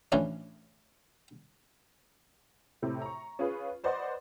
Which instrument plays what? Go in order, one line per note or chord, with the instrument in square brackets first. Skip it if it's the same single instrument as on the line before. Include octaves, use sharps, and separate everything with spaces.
[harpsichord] A2 E3 F3 C#4 D4
[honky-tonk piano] A2 C3
A#5 C#6
C#4 F4 G#4 B4
B4 C5 D5 D#5 F#5 C6